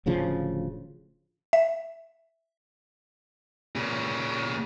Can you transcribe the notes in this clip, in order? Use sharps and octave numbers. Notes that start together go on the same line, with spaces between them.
D1 D2 C#3 F3
E5
A#2 C#3